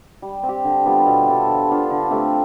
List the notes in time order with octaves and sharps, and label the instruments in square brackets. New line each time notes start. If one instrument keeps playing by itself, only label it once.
[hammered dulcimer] G3
C4
G4
D3
G3 B3 F4
B2
G3 D4 A4
F3
B3 D4 F4
D3
A3 C4 G4